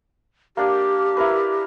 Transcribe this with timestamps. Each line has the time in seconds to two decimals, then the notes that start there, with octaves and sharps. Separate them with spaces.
0.57 A#3 D4 G4
1.17 E4 A#4 B4